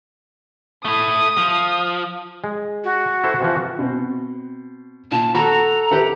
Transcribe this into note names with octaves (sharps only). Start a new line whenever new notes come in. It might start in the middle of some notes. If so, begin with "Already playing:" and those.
A3 E4 D#6
F3
G#3
F#4
E4 A4 C5
C3 E3 F3
B2 C4
A#2 A5
F#4 A4 A#5 B5
G4 B4 E5 F#5